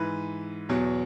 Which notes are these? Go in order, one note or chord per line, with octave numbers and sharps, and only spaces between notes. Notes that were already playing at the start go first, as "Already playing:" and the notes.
Already playing: G#2 E3 B4
E2 B2 F#3